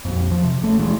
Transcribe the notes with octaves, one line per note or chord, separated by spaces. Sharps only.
A#1 F2
F3
C3
A1 A3
D#1 E3 G#3